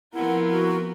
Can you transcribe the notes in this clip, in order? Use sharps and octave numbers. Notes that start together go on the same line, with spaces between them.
F3 B3 C4 E4 A#4 F#5
F#4